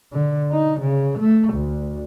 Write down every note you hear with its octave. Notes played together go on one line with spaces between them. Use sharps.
D3
D#4
C#3
A3
D2